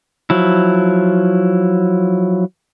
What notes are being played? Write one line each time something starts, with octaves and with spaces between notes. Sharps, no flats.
F3 F#3 E4